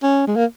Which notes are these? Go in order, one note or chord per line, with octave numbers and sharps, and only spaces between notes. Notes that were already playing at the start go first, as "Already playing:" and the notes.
C#4
G#3
A#3